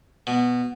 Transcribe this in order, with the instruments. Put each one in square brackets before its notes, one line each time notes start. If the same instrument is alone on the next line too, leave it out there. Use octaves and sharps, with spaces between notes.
[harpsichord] B2